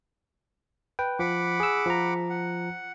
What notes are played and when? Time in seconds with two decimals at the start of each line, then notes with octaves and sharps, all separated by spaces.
0.99 B4 G5
1.19 F3 F#5 B5 D6
1.60 G#4 E6
1.86 F3 A#5
2.30 F#5